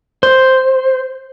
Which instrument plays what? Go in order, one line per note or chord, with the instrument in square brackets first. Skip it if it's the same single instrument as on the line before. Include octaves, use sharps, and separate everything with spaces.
[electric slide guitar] C5